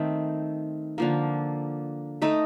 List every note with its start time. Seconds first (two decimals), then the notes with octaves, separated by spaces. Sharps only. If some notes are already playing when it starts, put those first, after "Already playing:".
Already playing: D#3 A3 C4
0.98 D3 F3 A#3
2.22 A3 D#4 A4 D#5